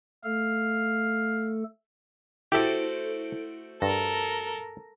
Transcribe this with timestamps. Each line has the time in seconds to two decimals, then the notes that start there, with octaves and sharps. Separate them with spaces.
0.24 A3 A4 F5
2.52 A3 E4 F#4 G4 A4 C5 E5 D7
3.82 G2 A4 A#4 A#6